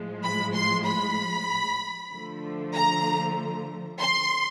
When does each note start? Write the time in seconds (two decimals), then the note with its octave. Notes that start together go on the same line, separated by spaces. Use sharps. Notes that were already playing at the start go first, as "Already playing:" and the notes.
Already playing: A2 F3 G#3
0.23 B5
0.55 C6
0.86 B5
2.12 D3 F3 A3
2.74 A#5
3.99 C6